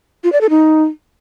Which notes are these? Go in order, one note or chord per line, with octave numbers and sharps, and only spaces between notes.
F4
D5
A4
D#4